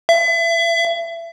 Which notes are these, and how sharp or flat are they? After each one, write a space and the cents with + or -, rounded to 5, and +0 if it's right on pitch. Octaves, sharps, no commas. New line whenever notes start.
E5 +30